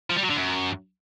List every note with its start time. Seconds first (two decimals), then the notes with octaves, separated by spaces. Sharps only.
0.10 F3
0.17 G3
0.23 F#3
0.30 D3
0.37 F#2